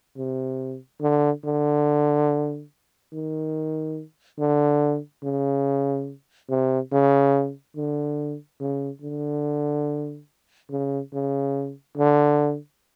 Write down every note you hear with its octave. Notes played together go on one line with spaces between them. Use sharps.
C3
D3
D3
D#3
D3
C#3
C3
C#3
D3
C#3
D3
C#3
C#3
D3